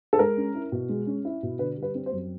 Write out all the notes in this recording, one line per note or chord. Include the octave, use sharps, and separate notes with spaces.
A4
G#3 A#4
C#4
E4
B2
G#3
C#4
E4
B2
D3 B4
G3
B4
C4
C5
F#2